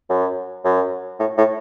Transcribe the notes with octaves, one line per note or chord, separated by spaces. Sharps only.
F#2
F#2
A2
A2